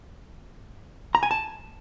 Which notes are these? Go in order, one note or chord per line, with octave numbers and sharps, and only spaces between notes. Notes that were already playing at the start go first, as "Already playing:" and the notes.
A#5
G#5
A5